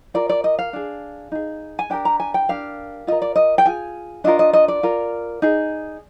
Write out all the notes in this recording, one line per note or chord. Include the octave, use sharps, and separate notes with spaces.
F4 A#4 D5
D5
D#5
F5
D4 G#4
D#4 G#4
G#5
D4 G4 A#4 G5
A#5
G#5
G5
D4 G4 A#4 F5
F4 A#4 D#5
D5
D#5
G5
F4 G#4 G#5
D4 F4 A#4 D#5
D#5
D#5
D5
F4 A#4
D#4 G#4